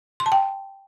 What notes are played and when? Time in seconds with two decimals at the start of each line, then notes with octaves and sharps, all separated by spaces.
0.20 C6
0.26 A5
0.32 G5